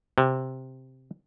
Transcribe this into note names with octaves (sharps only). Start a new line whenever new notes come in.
C3